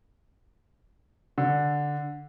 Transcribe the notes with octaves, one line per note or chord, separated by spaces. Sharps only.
D3